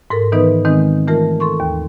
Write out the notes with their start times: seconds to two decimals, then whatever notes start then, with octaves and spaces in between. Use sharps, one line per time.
0.10 G#2 A4 A#4
0.32 D#3 E3 B3 D#4 B4
0.65 D#3 G#3 C4 D#4
1.08 E3 A3 F4 A#4
1.40 A4 C6 C#6
1.60 D#2